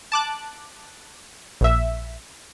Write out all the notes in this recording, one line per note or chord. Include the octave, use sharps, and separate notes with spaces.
A5 D6 F#6
A#1 E5